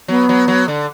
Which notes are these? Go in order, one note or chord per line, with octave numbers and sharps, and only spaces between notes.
F#3 B3
F#3
F#3
D3